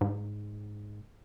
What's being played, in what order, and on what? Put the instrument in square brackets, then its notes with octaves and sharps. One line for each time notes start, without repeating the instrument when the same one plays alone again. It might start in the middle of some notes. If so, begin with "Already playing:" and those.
[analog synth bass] G#2